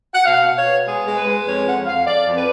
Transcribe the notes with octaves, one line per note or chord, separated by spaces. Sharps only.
F#5
B2 F5
B2
C#5
B3
G#3 G#4
G#3
B4
G#3
F2 C#5
F2 F#5
F2 F5
F2 D5
F2
B4